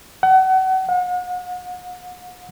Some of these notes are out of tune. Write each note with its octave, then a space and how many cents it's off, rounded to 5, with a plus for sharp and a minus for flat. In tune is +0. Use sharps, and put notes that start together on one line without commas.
F#5 +35
F#5 -40